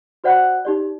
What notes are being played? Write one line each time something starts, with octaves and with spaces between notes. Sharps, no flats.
F#4 C5 D5 F#5 B5 F#6
D#4 G4 D5